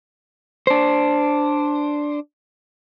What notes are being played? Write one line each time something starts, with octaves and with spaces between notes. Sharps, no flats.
D4 C5